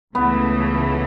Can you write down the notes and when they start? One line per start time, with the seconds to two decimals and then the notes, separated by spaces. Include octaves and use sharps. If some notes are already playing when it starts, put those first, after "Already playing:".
0.14 C#2 C#3 E3 A3 B3